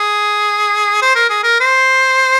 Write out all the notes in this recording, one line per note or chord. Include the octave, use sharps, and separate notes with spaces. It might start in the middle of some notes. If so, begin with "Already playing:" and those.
Already playing: G#4
C5
A#4
G#4
A#4
C5